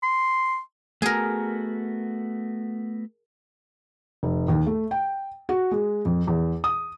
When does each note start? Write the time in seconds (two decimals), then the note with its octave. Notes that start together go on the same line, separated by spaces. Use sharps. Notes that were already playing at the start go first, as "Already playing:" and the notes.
0.03 C6
1.02 A3 B3 F#4 G#4 A#4
4.23 F1
4.48 D#2
4.67 A3
4.91 G5
5.49 F#4
5.71 G#3
6.05 F2
6.27 E2
6.64 D#6